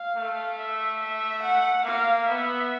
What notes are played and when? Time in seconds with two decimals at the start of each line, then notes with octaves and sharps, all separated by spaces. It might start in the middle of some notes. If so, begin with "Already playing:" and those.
Already playing: F5
0.15 A3
0.58 E5
1.00 E5
1.43 F#5
1.86 A#3 F5
2.28 B3 E5